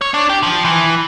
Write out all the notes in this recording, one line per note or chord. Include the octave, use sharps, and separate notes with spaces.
C#5
D4
G4
F3
E3